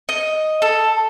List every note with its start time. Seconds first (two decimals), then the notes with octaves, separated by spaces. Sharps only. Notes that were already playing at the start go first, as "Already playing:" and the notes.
0.09 D#5
0.62 A4